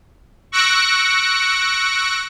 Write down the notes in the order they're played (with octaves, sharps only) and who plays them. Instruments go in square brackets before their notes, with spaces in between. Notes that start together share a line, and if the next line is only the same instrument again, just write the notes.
[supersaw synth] C#6 E6 F#6 A#6 C#7 D7